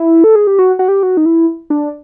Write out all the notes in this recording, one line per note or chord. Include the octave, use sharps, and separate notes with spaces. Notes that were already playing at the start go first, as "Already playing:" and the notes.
Already playing: E4
A4
G#4
G4
F#4
F#4
G4
F#4
D#4
E4
D4